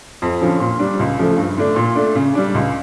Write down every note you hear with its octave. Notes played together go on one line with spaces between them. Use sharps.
F2
D3 F3 C#4
A#2
G3 D4
C#2
C#3 F3 A3
G2
D3 A3 D4
A#2
A3 D4
C#3
G3 D4
C#2